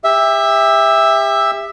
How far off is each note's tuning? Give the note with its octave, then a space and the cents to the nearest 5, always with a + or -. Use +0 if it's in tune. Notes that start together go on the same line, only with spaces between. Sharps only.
G4 +35 E5 +0